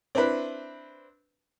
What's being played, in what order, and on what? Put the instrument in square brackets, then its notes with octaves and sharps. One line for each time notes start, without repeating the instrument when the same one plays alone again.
[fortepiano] C4 D4 E4 B4